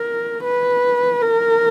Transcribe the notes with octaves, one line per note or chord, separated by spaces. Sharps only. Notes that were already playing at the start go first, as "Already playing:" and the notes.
Already playing: A#4
B4
A#4